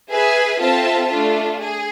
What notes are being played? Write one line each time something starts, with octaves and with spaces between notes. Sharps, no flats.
G#4 B4 E5 G#5
C4 F4 A4 E5 A5
A3 D4 F4
G#4